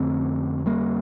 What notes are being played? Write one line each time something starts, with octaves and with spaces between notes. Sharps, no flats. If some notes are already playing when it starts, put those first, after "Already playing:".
Already playing: F2 D3 A3 C4
G3 A#3